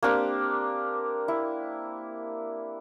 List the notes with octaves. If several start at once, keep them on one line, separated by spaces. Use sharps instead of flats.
A#3 C4 D4 G4
E4